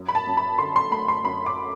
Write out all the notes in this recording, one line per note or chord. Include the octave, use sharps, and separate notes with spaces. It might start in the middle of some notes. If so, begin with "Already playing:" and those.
Already playing: F#2
B5
A5
F#2
B5
D3 C6
C6
A3 B5
C6
F#2 B5
D6